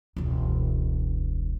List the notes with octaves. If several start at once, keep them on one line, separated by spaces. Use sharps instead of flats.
E1 C#2